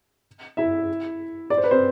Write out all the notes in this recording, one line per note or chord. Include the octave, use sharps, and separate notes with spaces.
E4 E5
D5
C5
B4
C4 C5